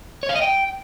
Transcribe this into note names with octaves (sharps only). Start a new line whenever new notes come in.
C#5
F5
D#5
G5